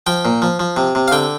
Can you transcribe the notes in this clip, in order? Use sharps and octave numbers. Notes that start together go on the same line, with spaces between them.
F3 G5
A#2
F3
F3
C3
C3
F5
D3 G5